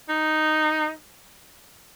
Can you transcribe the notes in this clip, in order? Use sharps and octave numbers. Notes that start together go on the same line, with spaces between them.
D#4